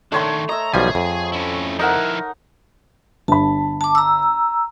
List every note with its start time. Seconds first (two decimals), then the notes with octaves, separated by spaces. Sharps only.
0.12 D#3 A3 D4 C#5 C6
0.49 D#5 E5 A#5
0.74 B1 F3 G3 G#4 G#5
0.95 F2
1.33 C#4 E4
1.79 F3 D#4 E4 A#4 F#5
3.28 G1 A5 B5
3.81 A5 D6
3.95 A#5 E6